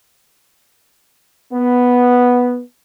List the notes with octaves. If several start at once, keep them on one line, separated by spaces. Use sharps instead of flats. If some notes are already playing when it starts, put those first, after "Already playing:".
B3